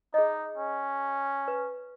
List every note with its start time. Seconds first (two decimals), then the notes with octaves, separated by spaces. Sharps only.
0.14 D#4 G#4 D#5
0.57 C#4
1.48 B4